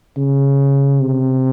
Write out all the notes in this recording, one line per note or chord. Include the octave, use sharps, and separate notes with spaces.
C#3
C3